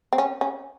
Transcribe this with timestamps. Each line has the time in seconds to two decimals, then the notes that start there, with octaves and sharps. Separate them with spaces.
0.13 C4
0.18 C#4
0.41 C#4